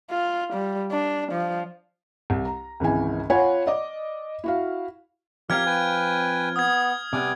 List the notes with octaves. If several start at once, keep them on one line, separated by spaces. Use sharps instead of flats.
F4
G3
D4
F3
C2
A#5
G#1 C#2 E3 G#5
F4 C#5 F#5 G#5 B5
D5 D#5 D6
E4 F#4 F5
F3 C4 G4 A#4 F5 F6 G#6
B4 G5 G#5
B3 D#6 G#6
C3 G3 B3 G#5 D6